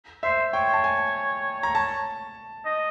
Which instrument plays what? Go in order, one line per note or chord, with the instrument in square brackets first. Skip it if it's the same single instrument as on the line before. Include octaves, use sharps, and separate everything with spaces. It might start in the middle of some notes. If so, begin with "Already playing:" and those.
[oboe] C5 [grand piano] E5
[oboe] C#5 [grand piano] G5
[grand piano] A5
G#5
A#5
A5
[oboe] D#5